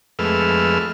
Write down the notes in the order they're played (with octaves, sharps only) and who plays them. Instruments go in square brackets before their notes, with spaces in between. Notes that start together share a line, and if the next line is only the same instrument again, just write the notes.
[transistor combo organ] F2 G#3 A3 B4 E6 F6